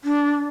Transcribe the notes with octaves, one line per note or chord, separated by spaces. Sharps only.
D4